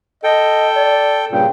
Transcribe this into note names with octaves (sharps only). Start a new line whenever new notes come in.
A4 D#5 G5
D5
G2 A#2 C#3 G5